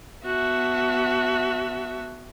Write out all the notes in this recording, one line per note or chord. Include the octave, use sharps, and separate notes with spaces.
B3 F#4 E5 A5